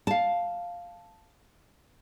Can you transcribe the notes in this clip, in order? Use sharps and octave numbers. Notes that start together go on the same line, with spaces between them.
F5 A5